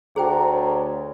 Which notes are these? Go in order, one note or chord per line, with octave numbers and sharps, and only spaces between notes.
D2 G#4 C5 G5 A#5
C#5